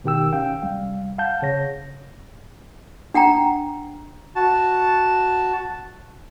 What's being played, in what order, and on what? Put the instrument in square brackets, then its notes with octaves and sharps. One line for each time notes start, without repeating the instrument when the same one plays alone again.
[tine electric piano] B2 D#3 G4 G5 E6
C#4 F5 G5
C2 G3 F5
F5 F#5 A5 G6
C#3 C#5 A#6
[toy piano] D4 F#5 G5 A#5
[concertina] F#4 A5